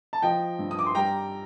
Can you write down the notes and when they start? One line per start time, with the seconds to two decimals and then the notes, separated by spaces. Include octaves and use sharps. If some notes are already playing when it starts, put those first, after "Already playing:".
0.13 A5
0.22 F3 D#5 G5
0.59 G2
0.71 D#6
0.79 D6
0.86 C6
0.95 G3 G5 A#5